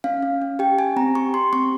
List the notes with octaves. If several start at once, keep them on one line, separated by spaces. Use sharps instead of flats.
C#4 F5
C#4
C#4
G4 G5
G4 G#5
C4 A#5
G4 C#6
G4 C6
C4 C#6